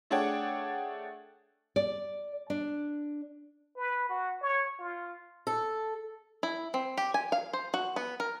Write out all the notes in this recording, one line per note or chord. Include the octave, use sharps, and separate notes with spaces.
A3 D4 G#4 C#5 F#5 G5
D5
D4
B4
F#4
C#5
F4
A4
E4
C4
G4
G#5
F5
C5
F#4
B3
A#4